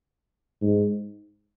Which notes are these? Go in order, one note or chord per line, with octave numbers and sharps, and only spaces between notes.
G#2